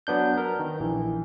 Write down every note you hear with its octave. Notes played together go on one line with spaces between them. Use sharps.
F#3 B3 D4 G6
A#4
D#3
A#1 E3